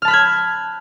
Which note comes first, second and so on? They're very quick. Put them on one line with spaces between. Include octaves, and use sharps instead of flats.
F6 A5 B5 F#6 G#6